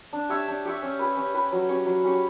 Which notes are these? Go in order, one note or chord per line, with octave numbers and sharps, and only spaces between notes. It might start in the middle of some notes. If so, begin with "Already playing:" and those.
D4
G4 C#5 E5
D4
G4 C#5 E5
C#4
G4 B4
C#4
G4 B4
F#3
C#4 G4 C#5
F#3
C#4 G4 C#5